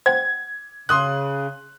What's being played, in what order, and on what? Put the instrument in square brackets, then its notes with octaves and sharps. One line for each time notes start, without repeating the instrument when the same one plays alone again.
[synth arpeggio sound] C5 F#5 G5 [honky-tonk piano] G#6
[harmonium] C#3 [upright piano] C6 D#6 F#6